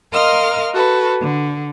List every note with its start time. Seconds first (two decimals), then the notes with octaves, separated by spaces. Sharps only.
0.13 A#4 D#5 F5 C6 F6
0.75 F#4 A4 B4
1.22 D3